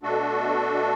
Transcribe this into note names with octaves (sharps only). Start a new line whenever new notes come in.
B2 A3 D4 F#4 A4